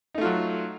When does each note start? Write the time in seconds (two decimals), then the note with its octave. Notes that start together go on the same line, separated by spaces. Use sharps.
0.15 D#4
0.18 A3
0.21 F4
0.25 F#3